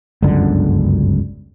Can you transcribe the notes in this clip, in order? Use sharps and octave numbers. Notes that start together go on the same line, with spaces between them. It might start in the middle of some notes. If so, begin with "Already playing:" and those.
G1 C#2 F#2 D3